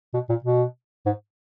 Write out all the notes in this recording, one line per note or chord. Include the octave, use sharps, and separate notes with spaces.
B2
A#2
B2
G#2